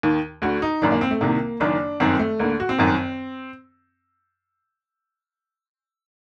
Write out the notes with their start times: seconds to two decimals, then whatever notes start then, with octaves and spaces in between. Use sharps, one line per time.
0.03 D#2 D#3
0.42 D2 D3 F#4
0.62 D#4
0.82 F#1 F#2 D#3 D4
0.92 A#3
1.01 C4
1.11 A3
1.21 C2 C3 D#3 A#3
1.60 F#1 F#2 D#3 D4
2.00 G1 F#2 D#3 C4
2.19 A3
2.40 D2 D3 A#3
2.60 F#4
2.69 C4
2.78 G1 F#2 D#3